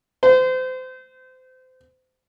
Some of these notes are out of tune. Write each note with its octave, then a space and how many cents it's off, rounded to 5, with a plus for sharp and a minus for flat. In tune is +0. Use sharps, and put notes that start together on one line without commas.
C5 -30